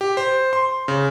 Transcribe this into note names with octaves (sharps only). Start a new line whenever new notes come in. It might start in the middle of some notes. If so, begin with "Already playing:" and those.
G4
C5
C6
C#3